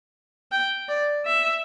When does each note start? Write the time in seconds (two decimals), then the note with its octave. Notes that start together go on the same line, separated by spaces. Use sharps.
0.52 G5
0.89 D5
1.26 E5